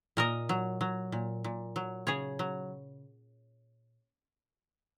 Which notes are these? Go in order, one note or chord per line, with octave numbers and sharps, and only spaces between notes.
A#2 A#4 D#5
F#3
F#3
A#2
A#2
F#3
C#3 G#4 C#5
F#3